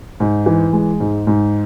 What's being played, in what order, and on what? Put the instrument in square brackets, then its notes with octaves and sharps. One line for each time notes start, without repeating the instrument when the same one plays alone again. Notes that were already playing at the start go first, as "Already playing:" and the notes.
[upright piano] G#2
E3
G#3
G#2
G#2